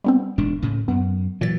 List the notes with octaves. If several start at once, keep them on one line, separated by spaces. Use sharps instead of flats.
G3 B3 C4
E1 G#2 D4
A2 C#3
F#2 B3
A#2 E3 F#3 A6